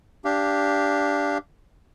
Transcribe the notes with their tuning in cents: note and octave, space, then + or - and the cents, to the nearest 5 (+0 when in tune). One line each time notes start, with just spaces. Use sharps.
D4 -10 G4 +0 F5 -25